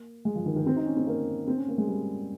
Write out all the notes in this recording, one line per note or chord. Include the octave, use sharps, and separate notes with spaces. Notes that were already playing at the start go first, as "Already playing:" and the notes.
Already playing: A#3
G#3
F3
D#3
D#3
C4
D#4
C#4
C4
A#3
C4
C#4
A#3
G#3
G3